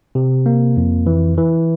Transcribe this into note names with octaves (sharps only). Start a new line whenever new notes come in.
C3
A#3
F2
E3
E3